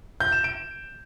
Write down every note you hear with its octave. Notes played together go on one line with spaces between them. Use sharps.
G6
E7
D7